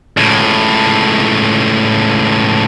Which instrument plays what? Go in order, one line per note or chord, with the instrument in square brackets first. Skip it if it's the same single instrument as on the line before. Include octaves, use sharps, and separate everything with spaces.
[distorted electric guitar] C#2 A2